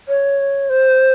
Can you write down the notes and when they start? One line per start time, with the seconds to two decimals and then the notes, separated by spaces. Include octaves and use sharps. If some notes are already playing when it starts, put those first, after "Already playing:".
0.08 C#5
0.70 C5